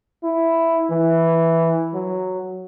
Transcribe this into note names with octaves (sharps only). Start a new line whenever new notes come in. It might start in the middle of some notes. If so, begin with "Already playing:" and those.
E4
E3
F#3